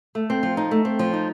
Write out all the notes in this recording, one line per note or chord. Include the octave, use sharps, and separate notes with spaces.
A3
C4
F3
D#4
A3
C4
F3
D#4